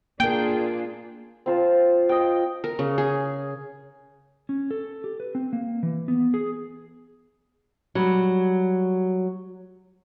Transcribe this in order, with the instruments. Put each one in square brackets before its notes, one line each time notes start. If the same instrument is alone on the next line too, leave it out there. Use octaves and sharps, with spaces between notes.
[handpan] A#3 A#4 [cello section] D4 F4 G#4 [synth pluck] G5
[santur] C4 F4 A5
D#5 G5
[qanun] A#4
C#3
G#4
[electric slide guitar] C#4
A4
G4
B4
C4
A#3
E3
B3
G#4
[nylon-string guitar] F#3 G3